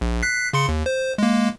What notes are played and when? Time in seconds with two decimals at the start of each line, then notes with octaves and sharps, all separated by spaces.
0.01 A#1
0.22 F#6 B6 C7
0.53 C#3 C6 C#7
0.68 D#2
0.86 C5
1.18 G#3 A#3